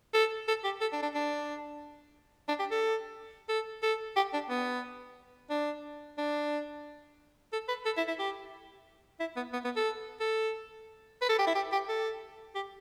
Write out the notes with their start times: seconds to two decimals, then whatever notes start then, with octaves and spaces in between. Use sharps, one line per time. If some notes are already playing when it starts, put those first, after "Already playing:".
0.14 A4
0.48 A4
0.64 G4
0.81 A4
0.93 D4
1.03 D4
1.14 D4
2.48 D4
2.59 G4
2.71 A4
3.49 A4
3.83 A4
4.16 G4
4.33 D4
4.49 B3
5.50 D4
6.18 D4
7.52 A4
7.68 B4
7.85 A4
7.97 E4
8.08 E4
8.19 G4
9.20 E4
9.36 B3
9.53 B3
9.64 B3
9.76 A4
10.20 A4
11.21 B4
11.29 A4
11.38 G4
11.47 E4
11.55 G4
11.72 G4
11.88 A4
12.55 G4